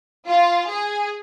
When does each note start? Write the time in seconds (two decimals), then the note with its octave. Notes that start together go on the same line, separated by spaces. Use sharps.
0.28 F4
0.70 G#4